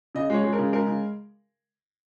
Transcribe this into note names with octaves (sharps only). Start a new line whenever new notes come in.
C#3 D#5
G#3 C#5
G#3
A#4
C#3
G#3 A#4
C#3